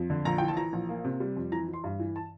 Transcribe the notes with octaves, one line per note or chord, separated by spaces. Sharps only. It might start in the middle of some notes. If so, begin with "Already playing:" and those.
Already playing: F2
D3
A#1 A#5
E3 G5
A5
E3 A#5
A#1
A#3
C3
G3
F2
E3 A#5
E3
C6
G2
E3
A5